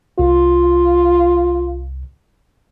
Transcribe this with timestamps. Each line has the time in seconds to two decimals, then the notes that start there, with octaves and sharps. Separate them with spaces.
0.19 C2 F4